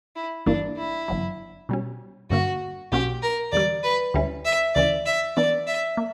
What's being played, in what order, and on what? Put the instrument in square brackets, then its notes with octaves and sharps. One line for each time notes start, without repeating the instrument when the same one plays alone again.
[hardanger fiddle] E4
[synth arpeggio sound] G1 G2 E3 A#3 [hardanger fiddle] D4
[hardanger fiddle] E4
[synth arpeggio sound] G1 F#2 E3
B2 G3 C#4
[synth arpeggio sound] G1 G2 D3 A#3 [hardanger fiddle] F#4
[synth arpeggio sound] B1 B2 A#3 C#4 F#4 [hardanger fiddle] G4
[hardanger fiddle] A#4
[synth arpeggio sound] E2 D3 G3 [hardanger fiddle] D5
[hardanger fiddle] B4
[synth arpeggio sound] D2 D3 G3 C#4 E4
[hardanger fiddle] E5
[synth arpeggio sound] D2 C#3 E3 [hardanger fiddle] D5
[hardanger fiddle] E5
[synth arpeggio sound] E3 B3 D4 [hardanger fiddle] D5
[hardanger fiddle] E5
[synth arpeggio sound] A#3